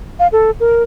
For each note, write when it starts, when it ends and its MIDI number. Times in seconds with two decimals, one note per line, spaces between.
0.19 0.27 77
0.32 0.51 69
0.60 0.83 70